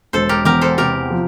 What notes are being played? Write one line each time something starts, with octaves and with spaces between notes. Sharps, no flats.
E1 A4 C5
G4 A#4
E2 G4 A#4
A4 C5
C3 G4 A#4
F3